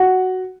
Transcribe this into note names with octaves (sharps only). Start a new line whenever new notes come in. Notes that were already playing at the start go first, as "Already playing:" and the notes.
Already playing: F#4 F#5